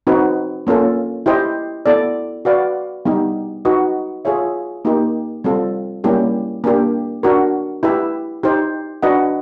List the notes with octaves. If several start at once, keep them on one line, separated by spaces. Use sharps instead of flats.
C4 D#4 F#4 B4
A#3 C#4 F4 A4
E4 G4 C5 D#5 G5
B3 E4 A4 D5
F#4 B4 D5 F5
G3 B3 D#4 G4
D#4 F#4 B4 D#5
F4 G#4 C#5 E5
A#3 D#4 G4
G3 C4 F4 A4
G3 A#3 C#4 E4 G4
A#3 D4 G4
D4 F#4 A#4
E4 G4 B4 E5
D#4 G4 C5
D4 F#4 B4 D#5 F#5